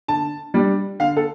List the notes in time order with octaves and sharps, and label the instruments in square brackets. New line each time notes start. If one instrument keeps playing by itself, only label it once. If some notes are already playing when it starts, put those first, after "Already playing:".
[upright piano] D3 A5
G3 D4
D3 F5
A4